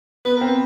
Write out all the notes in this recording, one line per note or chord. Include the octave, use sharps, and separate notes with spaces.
B3 B4
A#4
C4
B4